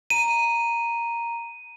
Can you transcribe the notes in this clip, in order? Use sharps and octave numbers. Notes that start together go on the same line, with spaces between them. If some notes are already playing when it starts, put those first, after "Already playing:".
A#5 D#7